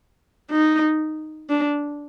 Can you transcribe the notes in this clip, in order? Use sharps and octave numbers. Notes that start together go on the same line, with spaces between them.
D#4
D4